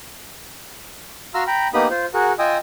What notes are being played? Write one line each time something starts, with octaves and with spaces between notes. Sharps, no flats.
F#4 F5 A#5 C6 E6 F6
G5 A#5 B5
A#3 B3 D#4 G4 B5 D#6
F4 C5
F#4 G#4 A#4 F#5
F4 D#5 G5 G#5 D#6 E6